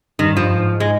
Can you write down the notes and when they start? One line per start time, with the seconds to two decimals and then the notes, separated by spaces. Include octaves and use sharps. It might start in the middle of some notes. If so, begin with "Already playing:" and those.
0.19 G2 D#3
0.31 G2
0.37 F3
0.43 G2
0.55 G#2
0.80 G#3